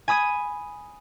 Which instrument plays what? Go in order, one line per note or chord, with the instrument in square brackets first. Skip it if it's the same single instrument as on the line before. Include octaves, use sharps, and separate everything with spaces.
[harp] G#5 B5 D#6 G#6 D#7